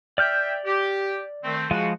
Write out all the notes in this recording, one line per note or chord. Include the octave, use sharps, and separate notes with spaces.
D5 E5 G5 F6 G6
G4
D#3 A3 C4
C#3 F3 G#3 F4 F#4